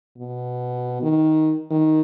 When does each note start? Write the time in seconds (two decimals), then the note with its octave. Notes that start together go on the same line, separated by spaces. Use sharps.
0.18 B2
1.02 D#3
1.71 D#3